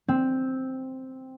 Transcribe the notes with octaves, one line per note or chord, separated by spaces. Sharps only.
C4